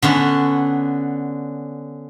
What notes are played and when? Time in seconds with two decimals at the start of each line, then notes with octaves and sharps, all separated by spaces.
0.02 D3 B3 C#4